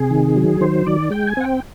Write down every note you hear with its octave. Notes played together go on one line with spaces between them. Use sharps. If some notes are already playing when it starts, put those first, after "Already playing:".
Already playing: C3 G#4
D#3
F#3
D#3 C5
D#3 D5
G#3 G5
G#5
C4 F#5
G5